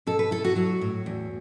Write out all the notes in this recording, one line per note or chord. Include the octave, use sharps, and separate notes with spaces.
B2 A4
B4
E4 A4
F#4
F#3 F#4
A2
E2